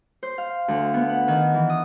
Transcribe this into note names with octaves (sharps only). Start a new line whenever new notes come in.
C5
F5
D2
B3
F#5
D#3
E3
D#6